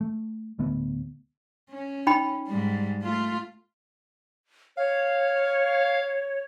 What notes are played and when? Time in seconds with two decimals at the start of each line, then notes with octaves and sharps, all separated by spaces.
0.01 A3
0.59 D1 D3 A3 B3
1.70 C#4
2.07 D#4 G5 B5
2.48 G#2 G3
3.02 A3 F4
4.77 C#5 F5